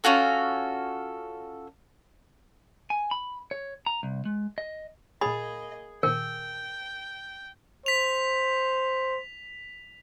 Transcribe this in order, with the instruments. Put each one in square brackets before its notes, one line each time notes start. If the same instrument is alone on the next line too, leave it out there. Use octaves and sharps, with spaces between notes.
[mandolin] C#4 F4 F#4 A4
[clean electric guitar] G#5
B5
C#5
A#5
C2
G#3
D#5
[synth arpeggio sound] A#2 A6 [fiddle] A#3 D#5 [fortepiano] G#4 [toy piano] B5
[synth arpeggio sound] A#2 D#3 [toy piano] A#4 [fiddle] G5
[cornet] C5 [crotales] B6 F7